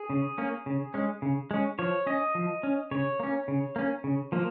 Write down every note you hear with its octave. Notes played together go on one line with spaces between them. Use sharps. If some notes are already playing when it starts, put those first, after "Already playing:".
Already playing: G#4
C#3
A#3 C#4
C#3
G#3 C#4
C#3
G#3 C#4
F3 C#5
C#4 D#5
F3
C#4
C#3 C#5
A#3 C#4
C#3
A#3 C#4
C#3
F3 A#3